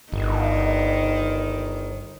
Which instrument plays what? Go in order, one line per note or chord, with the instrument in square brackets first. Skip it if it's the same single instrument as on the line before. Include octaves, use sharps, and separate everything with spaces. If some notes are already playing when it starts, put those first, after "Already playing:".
[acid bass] G1 [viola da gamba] D#3